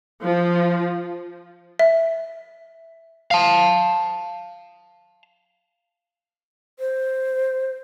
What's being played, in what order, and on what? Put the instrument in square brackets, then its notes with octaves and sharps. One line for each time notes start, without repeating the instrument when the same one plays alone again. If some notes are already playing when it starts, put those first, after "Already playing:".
[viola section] F3
[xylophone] E5
[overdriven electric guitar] F5 A5
[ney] C5